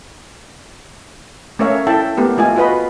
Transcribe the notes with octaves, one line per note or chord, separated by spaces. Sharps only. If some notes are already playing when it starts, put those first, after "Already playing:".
A3 C#4 A#4 C#5 E5 F5
E4 A4 E5 G5 A5
A3 B3 G4 A#4
A3 F4 D#5 G#5
F4 F#4 B4 D#5 B5